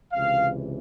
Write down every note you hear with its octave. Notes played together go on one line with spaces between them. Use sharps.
C#2 C3 E3 F5